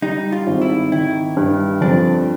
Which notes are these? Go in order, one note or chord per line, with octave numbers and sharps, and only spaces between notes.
G3 D#4
F4
G#1
E4
D#3 E4
G2
F2 D4